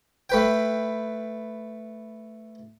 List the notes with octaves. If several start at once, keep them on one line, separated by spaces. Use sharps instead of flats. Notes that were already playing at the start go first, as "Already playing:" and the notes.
A3 B4 G5